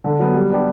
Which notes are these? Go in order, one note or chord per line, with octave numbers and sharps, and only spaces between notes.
D3
F#3 B3
G3
B3 D4 G4